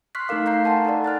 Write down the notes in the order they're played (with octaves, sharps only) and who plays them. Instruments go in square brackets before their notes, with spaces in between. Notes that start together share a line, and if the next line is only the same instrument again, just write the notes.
[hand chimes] C6 C#6 F6 F#6 B6 C7
A3 D#4 A4 A#4 F5 D6
D#4 F5 A#5 G6 C7
F#5 G#5 A5 C6
D#4 A4 A#4 D5
G#5 F6 F#6 A6